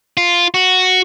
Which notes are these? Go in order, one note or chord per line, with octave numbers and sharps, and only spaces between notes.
F4
F#4